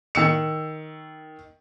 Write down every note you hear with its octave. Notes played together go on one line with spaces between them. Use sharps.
D#3 E6 C#7